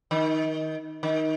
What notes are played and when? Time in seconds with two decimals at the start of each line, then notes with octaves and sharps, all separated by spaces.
0.11 D#3
1.03 D#3